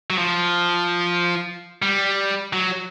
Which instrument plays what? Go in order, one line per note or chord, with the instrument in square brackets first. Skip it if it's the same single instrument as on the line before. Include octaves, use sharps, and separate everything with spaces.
[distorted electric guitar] F#3
F3
G3
F#3